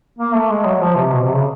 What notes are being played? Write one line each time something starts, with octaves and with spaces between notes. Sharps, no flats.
A#3
A3
G#3
F#3
F3
C3
B2
C3
C#3